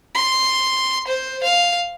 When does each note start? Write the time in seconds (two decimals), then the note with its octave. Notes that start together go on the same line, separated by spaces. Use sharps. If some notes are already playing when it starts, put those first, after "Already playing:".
0.15 C6
1.07 C5
1.43 F5